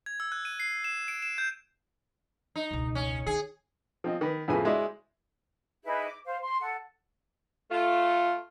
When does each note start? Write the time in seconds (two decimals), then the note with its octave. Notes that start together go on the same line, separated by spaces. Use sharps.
0.06 G#6
0.20 E6
0.32 F#6
0.45 D#7
0.60 C7
0.84 E7
1.08 D7
1.22 E7
1.38 G6
2.56 D#4
2.71 E1 C#2
2.95 C#4
3.26 D#3 G#4
4.04 F3 C4 D#5
4.21 D#3 B4
4.48 F2 A2 C#3 F3 B4 G#5
4.65 G#3 E4 F#4 C5 D5 D#5
5.84 D#4 E4 G#4 B4
6.05 D6
6.25 C5 F5
6.41 C6
6.61 A4 F#5
7.71 A3 F4